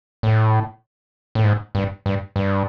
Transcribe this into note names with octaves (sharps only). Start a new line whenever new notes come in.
A2
A2
G#2
G2
G2
G2